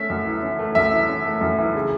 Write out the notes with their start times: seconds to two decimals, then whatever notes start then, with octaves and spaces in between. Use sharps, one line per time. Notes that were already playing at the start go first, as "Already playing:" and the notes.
Already playing: A3 C#4 E5
0.10 F#2
0.26 E3
0.43 C#4
0.59 A3
0.75 F#2 E5
0.92 E3
1.09 C#4
1.25 A3
1.41 F#2
1.58 E3
1.75 C#3